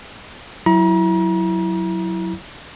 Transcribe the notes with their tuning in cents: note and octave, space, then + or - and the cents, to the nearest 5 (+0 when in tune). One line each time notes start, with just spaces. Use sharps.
F#3 +0 E4 +0 A#5 +35